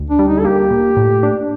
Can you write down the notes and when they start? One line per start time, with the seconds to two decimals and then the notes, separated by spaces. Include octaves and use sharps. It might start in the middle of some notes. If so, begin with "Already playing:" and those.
Already playing: D2
0.10 D4
0.19 G3
0.28 D#4
0.39 A4
0.44 A#3 G4
0.71 A#2
0.97 A2
1.23 D4